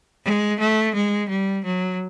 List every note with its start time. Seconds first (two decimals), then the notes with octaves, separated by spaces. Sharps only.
0.25 G#3
0.60 A3
0.95 G#3
1.30 G3
1.65 F#3